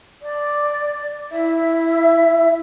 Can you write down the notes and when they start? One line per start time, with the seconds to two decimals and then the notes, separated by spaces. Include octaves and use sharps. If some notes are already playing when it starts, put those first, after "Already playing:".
0.22 D5
1.31 E4 E5